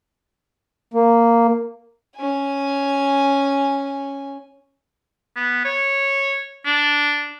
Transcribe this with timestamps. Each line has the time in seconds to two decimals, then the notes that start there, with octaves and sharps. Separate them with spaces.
0.94 A#3
2.16 C#4 G#5
5.36 B3
5.65 C#5
6.65 D4